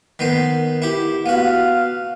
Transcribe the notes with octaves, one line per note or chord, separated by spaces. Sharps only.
D#3 B3 C5
E4 G4
B3 F#4 F5